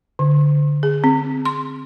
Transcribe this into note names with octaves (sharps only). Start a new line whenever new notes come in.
D3
G#4
C4
C6